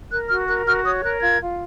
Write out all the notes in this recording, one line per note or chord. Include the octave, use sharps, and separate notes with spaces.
A#4 F#6
F#4 F6
A#4 F#6
F#4 F6
C#5 D#6
A#4 F#6
F4 G#6
F4